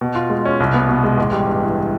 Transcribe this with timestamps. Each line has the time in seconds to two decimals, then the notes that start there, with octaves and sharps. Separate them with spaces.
0.01 B2
0.15 F4
0.30 G#3
0.45 C#4
0.60 C2
0.74 B3
0.89 B2
1.04 G#3
1.17 A1
1.32 G3
1.47 G2
1.62 E3